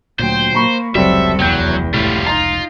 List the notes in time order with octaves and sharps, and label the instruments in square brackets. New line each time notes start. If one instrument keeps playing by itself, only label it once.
[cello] D2 G5 [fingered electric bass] A#2 F#3 [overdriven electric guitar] C5
[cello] A#3 [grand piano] A#5 B5 C#6
[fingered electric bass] F1 C#2 [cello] F#3 A4 [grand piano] G3 C4 [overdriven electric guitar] E5
[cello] E2 [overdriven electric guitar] F#3 [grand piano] G5 G6
[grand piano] A2 [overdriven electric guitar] G3 F4
[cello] D#4 [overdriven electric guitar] F4 [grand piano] A#5 C6